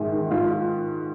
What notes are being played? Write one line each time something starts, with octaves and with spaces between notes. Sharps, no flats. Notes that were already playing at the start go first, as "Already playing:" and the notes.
Already playing: A#1 G#2 D#3 G#4
D#3
G#2 F4
F4